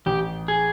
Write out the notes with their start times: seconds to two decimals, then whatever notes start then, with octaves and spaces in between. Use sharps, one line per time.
0.06 A1 G4
0.48 G#4